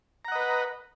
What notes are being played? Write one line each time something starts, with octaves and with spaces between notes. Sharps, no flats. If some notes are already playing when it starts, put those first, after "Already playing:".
B4 D#5 F#5 A#5